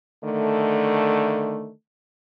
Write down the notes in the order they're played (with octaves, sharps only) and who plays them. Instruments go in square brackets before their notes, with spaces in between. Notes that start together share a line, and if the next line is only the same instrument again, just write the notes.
[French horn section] D3 D#3 A3